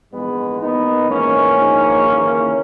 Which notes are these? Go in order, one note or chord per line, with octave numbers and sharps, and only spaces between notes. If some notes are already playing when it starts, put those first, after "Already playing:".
A#1 G#2 E3 G#3 B3
D#2 D#3 B3 D#4
A#1 G#2 E3 A#3 C#4
A#1 G#2 D#3
D#2 C#3 E3